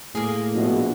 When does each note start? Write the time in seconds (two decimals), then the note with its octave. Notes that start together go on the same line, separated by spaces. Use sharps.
0.15 A2 A#3 G#4
0.54 A#1 E2 B2